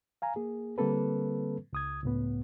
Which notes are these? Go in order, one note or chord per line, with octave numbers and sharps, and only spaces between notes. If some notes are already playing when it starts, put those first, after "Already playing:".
F5 G#5 A#5
A#3 G#4
D3 G3 A#3 C4 A4 B4
C#2 D#6 G#6
C#2 A2 B3